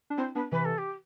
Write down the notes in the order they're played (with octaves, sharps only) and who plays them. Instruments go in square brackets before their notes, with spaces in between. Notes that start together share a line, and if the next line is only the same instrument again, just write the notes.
[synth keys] D4
[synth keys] C4 E4 [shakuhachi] C5
[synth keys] B3 D4 [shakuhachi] B4
[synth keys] C3 E3 [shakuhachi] B4
[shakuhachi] A4
G4